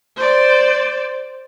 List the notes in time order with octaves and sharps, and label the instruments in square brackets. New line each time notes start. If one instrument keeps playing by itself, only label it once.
[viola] C5 D5